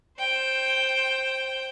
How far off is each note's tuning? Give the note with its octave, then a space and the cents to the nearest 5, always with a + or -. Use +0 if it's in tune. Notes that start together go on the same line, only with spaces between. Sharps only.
C5 +15 G5 +0